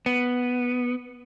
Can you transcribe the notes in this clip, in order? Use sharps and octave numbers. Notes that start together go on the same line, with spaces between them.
B3